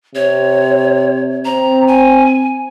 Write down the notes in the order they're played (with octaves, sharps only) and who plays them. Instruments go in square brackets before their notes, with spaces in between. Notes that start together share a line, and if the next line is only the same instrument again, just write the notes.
[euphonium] C3 [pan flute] C#5
[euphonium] C4 [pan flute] A#5
[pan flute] G#5